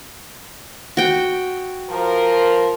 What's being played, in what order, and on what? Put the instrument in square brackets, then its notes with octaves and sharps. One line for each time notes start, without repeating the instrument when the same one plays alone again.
[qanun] F#4 G5
[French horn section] F3 A#4